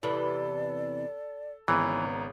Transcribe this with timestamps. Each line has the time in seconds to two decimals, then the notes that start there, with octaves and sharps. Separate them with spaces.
0.03 E2 C3 E3 A4 D5
1.68 G#1 C#3 E3 B3 A#5